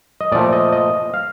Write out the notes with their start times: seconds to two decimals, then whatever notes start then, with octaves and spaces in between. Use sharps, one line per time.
0.21 D#5
0.32 A#2 F3 A3 D5
0.53 D#5
0.72 D#5
1.14 F5